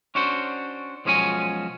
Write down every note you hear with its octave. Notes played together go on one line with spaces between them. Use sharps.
C#4 D4 F#4 C5
B1 F3 G#3 C#4 F#4 G#5